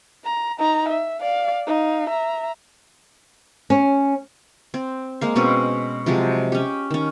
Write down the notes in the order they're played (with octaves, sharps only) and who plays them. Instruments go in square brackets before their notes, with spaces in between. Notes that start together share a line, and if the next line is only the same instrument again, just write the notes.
[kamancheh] A#5
D#4 A#5
E5
D5 F5
D#4 F5
E5 A#5
[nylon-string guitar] C#4
[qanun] C4
G#3 A#3 F5
B2 G#3 C4 C#4
C3 F3 F#3 G#3
C#4 G4
D#3 C#4